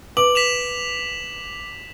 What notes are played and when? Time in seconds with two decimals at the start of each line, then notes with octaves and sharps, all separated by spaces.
0.17 B4 D6 F#7
0.35 B6 E7 F7